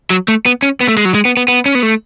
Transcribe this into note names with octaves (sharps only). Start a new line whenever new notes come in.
F#3
A3
B3
C#4
B3
A3
G#3
F#3
G#3
B3
B3
B3
C#4
B3
A3